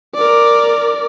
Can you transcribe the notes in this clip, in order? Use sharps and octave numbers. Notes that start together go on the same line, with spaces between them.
A#4 D5